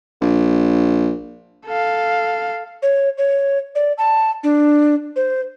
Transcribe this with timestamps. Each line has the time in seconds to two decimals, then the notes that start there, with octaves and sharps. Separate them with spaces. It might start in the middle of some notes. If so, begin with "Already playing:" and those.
0.21 A#1
1.66 A4 F5
2.83 C#5
3.18 C#5
3.75 D5
3.98 A5
4.43 D4
5.16 C5